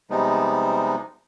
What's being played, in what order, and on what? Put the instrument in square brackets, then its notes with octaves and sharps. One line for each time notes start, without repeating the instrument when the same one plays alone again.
[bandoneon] C3 F3 G3 G#3 B3 D#4